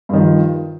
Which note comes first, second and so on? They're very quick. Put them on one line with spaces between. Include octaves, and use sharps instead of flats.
G2 D#3 F3